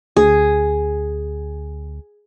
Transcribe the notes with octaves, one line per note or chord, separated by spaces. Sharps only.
D2 G#4